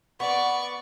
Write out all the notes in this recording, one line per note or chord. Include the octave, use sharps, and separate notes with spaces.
B3 D5 C#6